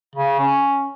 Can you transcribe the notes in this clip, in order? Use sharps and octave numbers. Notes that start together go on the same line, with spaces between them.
C#3
C#4